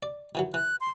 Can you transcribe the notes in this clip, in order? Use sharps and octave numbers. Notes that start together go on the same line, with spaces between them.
D5
D#3 E3 F#3
E3 F#6
C6